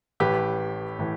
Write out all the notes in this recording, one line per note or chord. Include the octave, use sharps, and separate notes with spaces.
A1 A2 E3 G4 B4
A2 E3